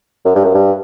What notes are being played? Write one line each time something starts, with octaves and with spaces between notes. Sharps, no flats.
F#2
G2
F#2
G2